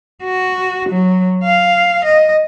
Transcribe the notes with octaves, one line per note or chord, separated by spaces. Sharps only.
F#4
F#3
F5
D#5